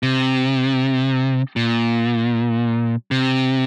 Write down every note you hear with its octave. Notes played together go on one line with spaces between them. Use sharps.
C3
A#2
C3